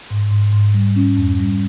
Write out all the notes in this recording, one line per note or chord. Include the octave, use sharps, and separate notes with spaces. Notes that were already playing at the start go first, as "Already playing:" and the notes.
G#2
G#2
G#2
G3
C#4
F2
G3